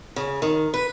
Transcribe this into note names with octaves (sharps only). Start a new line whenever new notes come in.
C#3
D#3
B4